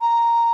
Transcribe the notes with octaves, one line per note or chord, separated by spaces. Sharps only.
A#5